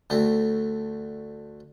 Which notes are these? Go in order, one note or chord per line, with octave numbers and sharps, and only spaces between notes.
D2 A3 C4